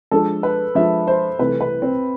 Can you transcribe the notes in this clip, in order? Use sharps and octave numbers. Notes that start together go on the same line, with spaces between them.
F3 G#3 D4 A4
B4
F3 G#3 D4 E5
C5
C2 C3 E3 A3 B4
B4
C4